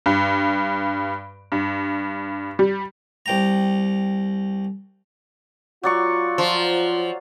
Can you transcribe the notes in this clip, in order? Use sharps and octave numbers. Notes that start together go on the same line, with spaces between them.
G2
G2
G3
C2 G5 A#5
F#3 F4 D5 C#6
F3